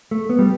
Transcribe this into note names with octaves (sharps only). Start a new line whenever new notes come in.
A3
B3
G3